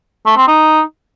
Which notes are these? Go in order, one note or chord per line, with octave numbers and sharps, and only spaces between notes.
A3
C4
D#4